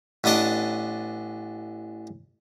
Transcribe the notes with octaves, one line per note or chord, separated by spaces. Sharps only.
A1 B3 D4 D#5 A5 D6